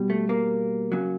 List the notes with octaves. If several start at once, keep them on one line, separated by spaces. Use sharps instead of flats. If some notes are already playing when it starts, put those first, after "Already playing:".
Already playing: B2 G3
A3
A#3
C#3 F#3